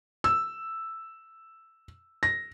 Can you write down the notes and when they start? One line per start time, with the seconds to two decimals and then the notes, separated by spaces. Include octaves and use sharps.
0.24 E6
2.23 A#6